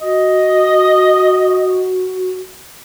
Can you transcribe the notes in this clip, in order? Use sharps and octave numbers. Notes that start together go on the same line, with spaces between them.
F#4 D#5